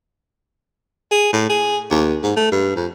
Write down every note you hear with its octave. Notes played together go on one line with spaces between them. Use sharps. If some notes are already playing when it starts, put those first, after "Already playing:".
G#4
A2
G#4
D#2
G#2
A3
G2
F2